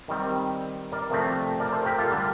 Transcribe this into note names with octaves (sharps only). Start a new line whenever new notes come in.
D#3 G3 C4
A#4 D5
C3 F3 A3 C4
A#4 D5
A4 C5
G4 A#4
F4 A4
D3 G3 A#3